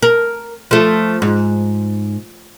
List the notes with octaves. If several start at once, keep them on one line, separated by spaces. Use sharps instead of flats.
A#4
F3 A3
G#2